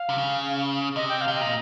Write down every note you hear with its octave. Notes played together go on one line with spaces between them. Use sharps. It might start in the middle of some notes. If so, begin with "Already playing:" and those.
Already playing: F5
C3
C#3
C3 D#5
G5
F5
C3
D#5
A#2